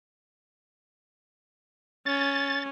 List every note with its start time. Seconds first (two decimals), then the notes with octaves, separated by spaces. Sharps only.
2.06 C#4 A6